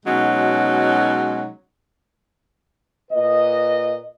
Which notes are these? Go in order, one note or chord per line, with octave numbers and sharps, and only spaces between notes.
B2 F#3 G#3 C#4 D#4
A#2 B4 D#5